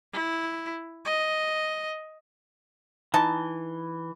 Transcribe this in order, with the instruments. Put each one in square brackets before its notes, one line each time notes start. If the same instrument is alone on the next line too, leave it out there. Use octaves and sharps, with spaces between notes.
[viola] E4
D#5
[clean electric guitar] E3 [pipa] D#4 A5